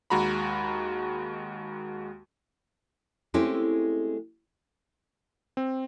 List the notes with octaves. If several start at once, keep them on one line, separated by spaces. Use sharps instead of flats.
D#2 G#3 F#4 A#5 B5
G#3 A3 C4 C#4 E4 G4
C4